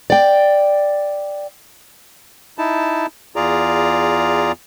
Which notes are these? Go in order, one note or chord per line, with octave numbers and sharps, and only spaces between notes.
D5 G5
D#4 E4 A5
E2 F4 G#4 D5 A#5